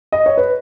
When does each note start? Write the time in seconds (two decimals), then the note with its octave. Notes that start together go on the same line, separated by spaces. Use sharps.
0.12 D#5
0.26 C#5
0.37 B4